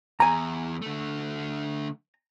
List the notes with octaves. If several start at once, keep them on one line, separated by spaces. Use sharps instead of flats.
E2 G#5 A#5
D3 A3